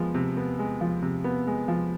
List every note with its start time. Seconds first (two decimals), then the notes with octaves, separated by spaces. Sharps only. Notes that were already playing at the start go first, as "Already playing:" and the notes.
Already playing: F3 G#3 B3
0.14 C3
0.37 B3
0.59 G#3
0.81 F3
1.02 C3
1.24 B3
1.47 G#3
1.68 F3